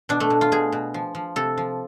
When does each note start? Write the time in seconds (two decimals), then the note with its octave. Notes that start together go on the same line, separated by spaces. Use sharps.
0.09 B2 D4
0.20 A3
0.30 B2
0.41 F4
0.52 B2 G#4
0.72 B2
0.94 F3
1.15 F3
1.36 C3 A4
1.57 F3